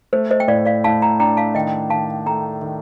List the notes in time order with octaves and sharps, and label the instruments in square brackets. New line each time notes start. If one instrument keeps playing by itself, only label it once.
[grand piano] A3 [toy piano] C5
[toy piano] C5 D#5
G5
[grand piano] A2 [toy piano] D5 F5
[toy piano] D5 F5
[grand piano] A2 [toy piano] F5 A5
[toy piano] G5 A#5
[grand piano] D4 [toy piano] G5 A#5
[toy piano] F5 A5
[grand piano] D#3 [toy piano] D#5 G5
[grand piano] D#3 [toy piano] F5 A5
[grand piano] A3 [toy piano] G5 A#5
[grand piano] D#3